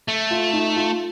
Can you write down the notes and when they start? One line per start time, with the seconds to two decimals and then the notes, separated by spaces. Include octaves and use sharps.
0.08 A3
0.31 F4
0.53 D#4
0.76 F4